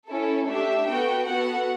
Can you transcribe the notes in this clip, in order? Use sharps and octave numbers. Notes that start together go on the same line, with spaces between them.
C#4 E4 A4
A3 D4 G4 E5
B3 F#4 A4 G5
B3 F#4 A4 F#5